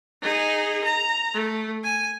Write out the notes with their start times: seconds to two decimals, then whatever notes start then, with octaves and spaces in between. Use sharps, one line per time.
0.22 D#4 G#4
0.84 A#5
1.34 A3
1.84 G#5